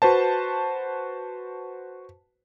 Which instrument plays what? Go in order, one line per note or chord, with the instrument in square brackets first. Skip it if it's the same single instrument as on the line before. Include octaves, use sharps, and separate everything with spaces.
[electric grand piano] F#4 B4 C5 A5